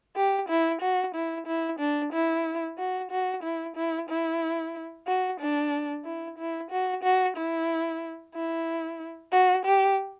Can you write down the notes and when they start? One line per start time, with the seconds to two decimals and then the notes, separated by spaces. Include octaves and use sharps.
0.16 G4
0.49 E4
0.81 F#4
1.15 E4
1.47 E4
1.79 D4
2.13 E4
2.78 F#4
3.11 F#4
3.43 E4
3.76 E4
4.09 E4
5.07 F#4
5.40 D4
6.05 E4
6.38 E4
6.71 F#4
7.03 F#4
7.37 E4
8.35 E4
9.32 F#4
9.66 G4